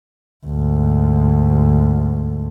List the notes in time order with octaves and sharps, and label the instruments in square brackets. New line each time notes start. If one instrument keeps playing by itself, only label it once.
[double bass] D2 G#2